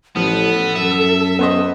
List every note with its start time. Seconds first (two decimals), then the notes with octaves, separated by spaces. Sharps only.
0.16 A1 F3 B3 A4
0.75 F#2 E5
1.39 B3 C5 D#5